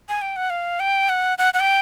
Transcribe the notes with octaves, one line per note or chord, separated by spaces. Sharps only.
G#5
G5
F#5
F5
G5
F#5
F#5
F#5
G5